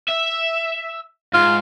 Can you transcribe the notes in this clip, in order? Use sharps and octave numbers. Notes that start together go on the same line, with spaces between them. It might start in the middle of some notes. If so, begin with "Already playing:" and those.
E5
G#2 F4